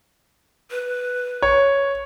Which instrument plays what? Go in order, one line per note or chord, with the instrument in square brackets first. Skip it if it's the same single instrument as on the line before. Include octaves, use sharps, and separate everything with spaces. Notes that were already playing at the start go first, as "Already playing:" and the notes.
[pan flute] B4
[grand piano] C#5